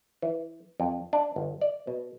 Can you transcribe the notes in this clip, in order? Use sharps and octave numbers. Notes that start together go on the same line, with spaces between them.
E3
F2
D4
G1
D5
B2